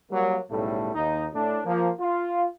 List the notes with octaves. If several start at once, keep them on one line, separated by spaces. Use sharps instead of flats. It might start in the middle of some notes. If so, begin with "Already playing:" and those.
F#3 G3 A#3
B1 A2 C#3 G3 A3
D#2 D#4
A2 D4
F3 A#3
F4